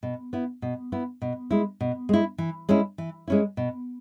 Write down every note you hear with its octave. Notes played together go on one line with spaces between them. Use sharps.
B2
B3 E4
B2
B3 E4
B2
G#3 E4
B2
G#3 E4
E3
G#3 C#4 E4
E3
G#3 C#4 E4
B2